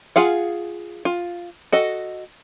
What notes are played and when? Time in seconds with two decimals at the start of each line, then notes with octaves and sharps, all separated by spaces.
0.16 F4 G#4 F5 F#5
1.05 F4
1.72 F#4 A4 D#5